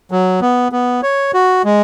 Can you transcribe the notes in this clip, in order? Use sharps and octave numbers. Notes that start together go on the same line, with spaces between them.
F#3
B3
B3
C#5
F#4
G#3